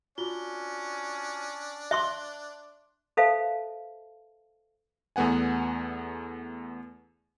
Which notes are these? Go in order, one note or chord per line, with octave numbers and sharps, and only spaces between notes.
C#4 D4 F4 F#4 G7
E5 C6 C#6 F#6 G7
A4 B4 C5 E5 F5 A5
E2 A3 B3 F#5 G#5